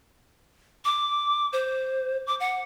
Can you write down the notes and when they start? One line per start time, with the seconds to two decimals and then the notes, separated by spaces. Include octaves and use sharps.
0.85 D6
1.53 C5
2.27 D6
2.40 F#5